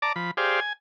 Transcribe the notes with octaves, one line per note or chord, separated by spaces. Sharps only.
D5 A5 A#5 D6
F3 B5
G4 G#4 C5 D5 F5
G#5